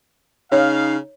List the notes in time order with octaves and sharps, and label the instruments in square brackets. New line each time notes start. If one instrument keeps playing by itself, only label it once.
[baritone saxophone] C#3 [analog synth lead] D#4 [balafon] C#5 [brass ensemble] F5